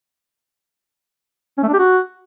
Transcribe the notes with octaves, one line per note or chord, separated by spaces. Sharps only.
C#4
A3
D4
G4
F#4